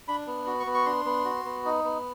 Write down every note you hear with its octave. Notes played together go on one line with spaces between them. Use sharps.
D4 B5
B3
F#4
C#6
B3
C#6
D4 C6
B3
F#4
B3
D#4
B3